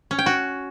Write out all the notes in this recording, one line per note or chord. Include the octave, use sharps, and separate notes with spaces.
C#4
G5
F#4